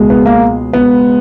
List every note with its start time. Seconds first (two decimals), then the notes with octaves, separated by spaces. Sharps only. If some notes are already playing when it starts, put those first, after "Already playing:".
Already playing: C#2 B2 G#3
0.10 B3
0.26 A#3
0.73 B3